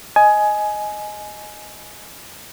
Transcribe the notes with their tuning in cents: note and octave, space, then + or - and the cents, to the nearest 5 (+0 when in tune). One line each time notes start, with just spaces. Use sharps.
D#5 +0 G#5 +15